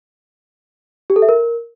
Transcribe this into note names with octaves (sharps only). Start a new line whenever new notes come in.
G4
A4
E5
A#4